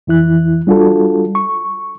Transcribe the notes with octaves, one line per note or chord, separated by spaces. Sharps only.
F2 E3 E4 F#6
G3 D4 F4 F#4 A4
C#6